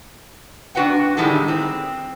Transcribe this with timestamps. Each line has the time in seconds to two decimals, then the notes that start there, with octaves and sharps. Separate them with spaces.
0.75 C3 D4 F#4 B4 F#5 G5
1.17 A2 D3 D#3 G3 G#3 E4
1.48 C4